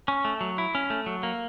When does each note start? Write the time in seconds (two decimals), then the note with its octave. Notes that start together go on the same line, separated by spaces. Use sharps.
0.08 C#4
0.25 A3
0.41 F#3
0.58 E4
0.75 C#4
0.90 A3
1.06 F#3
1.23 A#3